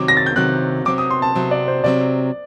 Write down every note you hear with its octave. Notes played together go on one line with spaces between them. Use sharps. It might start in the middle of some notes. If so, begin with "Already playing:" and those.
Already playing: C3 D#3 F#3 C4 D6
A#6
A6
G6
C3 D#3 F#3 C4 F#6
C3 F#3 C4 D6
D#6
C6
A5
C3 F#3 C4
D5
C5
C3 F#3 C4 D5